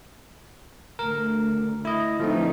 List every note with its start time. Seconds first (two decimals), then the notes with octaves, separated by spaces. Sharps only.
0.99 D2 A#4
1.85 E4 D#5
2.20 D3 E3 F3 A3 C4 D#4